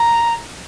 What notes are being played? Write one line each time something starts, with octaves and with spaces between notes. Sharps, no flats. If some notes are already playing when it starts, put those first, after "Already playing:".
Already playing: A#5